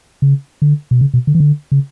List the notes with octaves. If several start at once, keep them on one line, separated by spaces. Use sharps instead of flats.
C#3
D3
B2
C#3
B2
D3
E3
D3
C#3